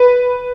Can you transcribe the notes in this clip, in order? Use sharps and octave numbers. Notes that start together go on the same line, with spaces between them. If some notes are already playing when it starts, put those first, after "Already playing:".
Already playing: B4